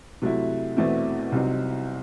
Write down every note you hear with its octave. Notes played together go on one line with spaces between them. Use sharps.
C3 F#3 A3 E4
E2 B2 A3 C4 E4
C2 C3 F#3 C4 D#4